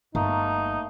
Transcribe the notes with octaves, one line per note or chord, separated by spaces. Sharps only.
G1 A3 A#3 D#4